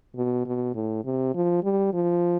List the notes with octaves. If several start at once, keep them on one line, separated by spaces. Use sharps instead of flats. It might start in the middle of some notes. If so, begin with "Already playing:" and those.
B2
B2
A2
C3
F3
G3
F3